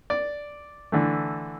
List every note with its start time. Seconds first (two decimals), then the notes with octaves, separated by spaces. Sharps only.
0.10 D5
0.92 D3 E3 A3